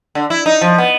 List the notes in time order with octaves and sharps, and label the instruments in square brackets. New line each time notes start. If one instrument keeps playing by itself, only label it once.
[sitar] D3
E4
D#4
F3
B3